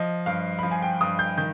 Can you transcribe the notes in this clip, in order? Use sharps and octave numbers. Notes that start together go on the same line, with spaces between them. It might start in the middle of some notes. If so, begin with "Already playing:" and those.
Already playing: F3 D#5
G2 F5
F3 B5
G#5
G5
G2 D#6
G6
D#3 G6